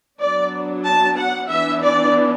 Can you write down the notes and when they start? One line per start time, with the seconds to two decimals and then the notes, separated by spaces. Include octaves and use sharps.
0.20 F#3 B3 D4 D5
0.85 A5
1.17 F#5
1.50 E3 B3 D4 E5
1.83 D5